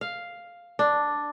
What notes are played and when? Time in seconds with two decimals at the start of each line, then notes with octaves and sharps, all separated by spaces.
0.01 F5
0.79 D4